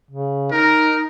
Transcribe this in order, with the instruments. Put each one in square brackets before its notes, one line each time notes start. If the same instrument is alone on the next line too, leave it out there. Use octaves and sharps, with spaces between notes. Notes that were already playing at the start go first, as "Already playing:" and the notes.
[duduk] C#3
[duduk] D#4 [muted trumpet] A#4